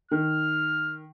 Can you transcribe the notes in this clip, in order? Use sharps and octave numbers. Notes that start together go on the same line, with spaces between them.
D#3 F6